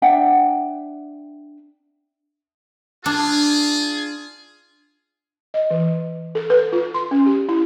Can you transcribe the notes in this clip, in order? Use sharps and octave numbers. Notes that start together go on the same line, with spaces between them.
D4 E5 F#5 G5
D4 F4 G#4
D#5
E3
A4
B4
F4
C6
C#4
G4
E4